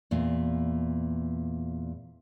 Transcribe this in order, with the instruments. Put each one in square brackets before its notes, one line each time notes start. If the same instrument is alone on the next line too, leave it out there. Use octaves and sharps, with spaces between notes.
[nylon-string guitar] E2 A#2